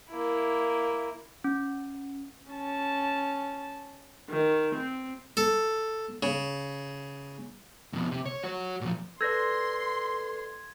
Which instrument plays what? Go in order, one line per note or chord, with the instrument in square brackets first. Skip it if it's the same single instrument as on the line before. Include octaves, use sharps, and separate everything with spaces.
[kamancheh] A#3 E4
[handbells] C#4
[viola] C#4 A5
D#3
C4
[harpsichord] A4
C#3
[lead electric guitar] F2 B2
C3
C#5
F#4 C#5
A#2 F3
[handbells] A4 B4 D5 [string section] C6 [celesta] E6 G6 A#6 [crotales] G#6